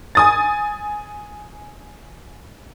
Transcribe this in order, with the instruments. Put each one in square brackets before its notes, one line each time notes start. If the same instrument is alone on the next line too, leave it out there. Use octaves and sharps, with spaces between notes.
[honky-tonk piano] G#5 D#6 A6